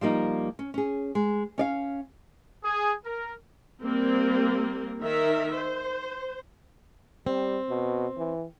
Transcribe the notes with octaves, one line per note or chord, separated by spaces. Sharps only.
F3 G3 A#3 D#4
C#4
C#4 G#4
G#3
C#4 D5 F5
G#4
A#4
G3 A#3 C4 A#4
D#3 A#4 E5
C5
G3 C4
B2
E3